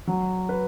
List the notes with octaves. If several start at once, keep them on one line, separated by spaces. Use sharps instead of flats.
F#3
B4